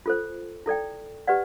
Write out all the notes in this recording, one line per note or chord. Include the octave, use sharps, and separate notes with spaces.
F4 A4 C5
E4 A4 D5 G5
G4 B4 D5 F#5